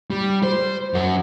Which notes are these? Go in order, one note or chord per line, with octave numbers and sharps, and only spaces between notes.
G3
C5
F#2 F#4